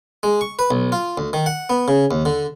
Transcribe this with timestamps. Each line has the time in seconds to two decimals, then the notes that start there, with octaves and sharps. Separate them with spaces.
0.23 G#3
0.41 C#6
0.59 B4
0.71 B1
0.92 F4
1.18 D2
1.33 D#3
1.46 F#5
1.70 B3
1.88 C#3
2.11 D#2
2.25 D3